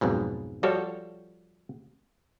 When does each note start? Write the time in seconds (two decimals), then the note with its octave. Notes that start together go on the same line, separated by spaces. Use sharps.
0.01 B1 F2 G#2 B2
0.63 F3 G3 F#4 A4 C#5